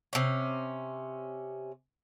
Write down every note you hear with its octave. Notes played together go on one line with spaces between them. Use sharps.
C3 C#4